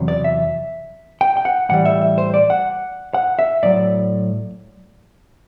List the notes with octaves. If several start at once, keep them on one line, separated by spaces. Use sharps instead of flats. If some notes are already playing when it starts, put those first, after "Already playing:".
Already playing: E2 C3 F#3
D5
E5
G5
G5
F#5
A2 E3 G3 F#5
E5
E5
C5
D5
F#5
F#5
E5
A2 F#3 D5